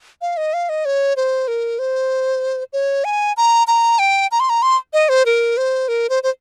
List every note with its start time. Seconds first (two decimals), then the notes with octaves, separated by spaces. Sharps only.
0.21 F5
0.37 D#5
0.54 F5
0.69 D#5
0.85 C#5
1.16 C5
1.48 A#4
1.79 C5
2.73 C#5
3.04 G#5
3.37 A#5
3.67 A#5
3.99 G5
4.31 A#5
4.40 C6
4.49 A#5
4.62 C6
4.93 D#5
5.09 C5
5.26 A#4
5.57 C5
5.88 A#4
6.09 C5
6.23 C5